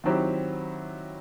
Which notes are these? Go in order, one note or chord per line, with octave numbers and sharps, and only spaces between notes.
D#3 F#3 C4 E4 G4